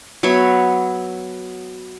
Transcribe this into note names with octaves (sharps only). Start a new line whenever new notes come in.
F#3 B3 C#5 E5